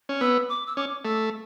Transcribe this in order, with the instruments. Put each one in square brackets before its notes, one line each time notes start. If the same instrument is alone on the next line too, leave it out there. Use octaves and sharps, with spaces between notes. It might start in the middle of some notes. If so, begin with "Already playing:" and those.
[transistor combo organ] C#4
[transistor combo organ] B3 [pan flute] E6
[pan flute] D6
E6
[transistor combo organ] C#4 [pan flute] D6
[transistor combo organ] A3 [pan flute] E6